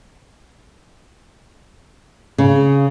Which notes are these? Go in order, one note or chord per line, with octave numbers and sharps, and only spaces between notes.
C#3